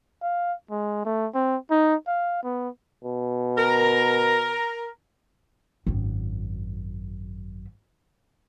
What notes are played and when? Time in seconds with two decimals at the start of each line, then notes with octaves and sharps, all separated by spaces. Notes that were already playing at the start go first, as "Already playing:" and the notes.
0.22 F5
0.70 G#3
1.05 A3
1.34 C4
1.71 D#4
2.07 F5
2.43 B3
3.04 B2
3.57 A#4
5.87 G#1 F#2